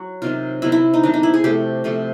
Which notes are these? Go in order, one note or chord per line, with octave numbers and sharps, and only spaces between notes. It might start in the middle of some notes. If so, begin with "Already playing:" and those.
Already playing: F#3 F#4
C3 D#3 F#3 F4
C3 D#3 F#3 E4
E4
D#4
C3 D#3 F#3 D4
D#4
E4
G#4
C3 F3 A3 G4
C3 F3 A3